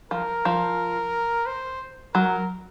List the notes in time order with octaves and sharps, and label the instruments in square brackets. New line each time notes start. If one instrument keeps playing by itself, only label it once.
[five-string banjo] F3 [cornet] A#4
[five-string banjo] F3
[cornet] C5
[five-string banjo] F#3 [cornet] A#4